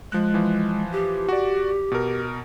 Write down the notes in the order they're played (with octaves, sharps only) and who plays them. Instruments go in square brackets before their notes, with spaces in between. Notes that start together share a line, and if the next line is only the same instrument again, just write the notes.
[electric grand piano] F3 F#6 [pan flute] G#3
[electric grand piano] E3 F3
[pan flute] G4
[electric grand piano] F#4 D5
B2 A#4